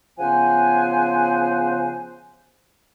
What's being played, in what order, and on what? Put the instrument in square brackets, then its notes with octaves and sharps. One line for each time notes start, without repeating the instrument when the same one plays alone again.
[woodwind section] C#3 F3 B3 C5 F#5 G#5